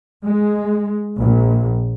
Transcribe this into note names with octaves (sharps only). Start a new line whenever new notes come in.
G#3
A#1